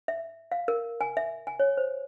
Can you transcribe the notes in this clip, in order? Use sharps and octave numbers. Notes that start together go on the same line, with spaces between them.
E5
F5
A#4
G#5
E5
G#5
C#5
C5